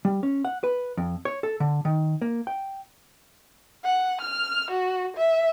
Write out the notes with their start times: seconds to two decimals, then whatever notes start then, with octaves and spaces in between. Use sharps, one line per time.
0.05 G3
0.23 C#4
0.45 F#5
0.64 B4
0.97 F2
1.25 C#5
1.43 A4
1.60 D3
1.85 D#3
2.22 A#3
2.47 G5
3.85 F#5
4.21 F6
4.71 F#4
5.17 E5